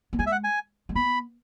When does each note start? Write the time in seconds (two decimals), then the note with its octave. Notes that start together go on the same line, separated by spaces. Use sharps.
0.13 B3
0.19 G#3 G#5
0.26 E5
0.32 F#5
0.44 G#5
0.89 G#3
0.95 B3 B5